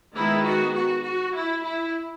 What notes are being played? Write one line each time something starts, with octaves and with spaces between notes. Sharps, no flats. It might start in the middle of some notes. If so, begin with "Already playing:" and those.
D#3 G#3 B3 E4
F#4
F#4
F#4
E4
E4